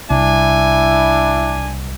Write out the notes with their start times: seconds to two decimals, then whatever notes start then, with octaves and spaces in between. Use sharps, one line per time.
0.10 C2 D4 E4 G#5